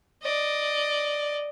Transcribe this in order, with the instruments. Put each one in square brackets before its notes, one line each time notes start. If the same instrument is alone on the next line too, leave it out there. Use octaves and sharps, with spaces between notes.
[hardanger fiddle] D5 D#5